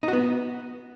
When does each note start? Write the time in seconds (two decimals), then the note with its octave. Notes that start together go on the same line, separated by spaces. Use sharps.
0.03 D#4
0.08 F#4
0.13 B3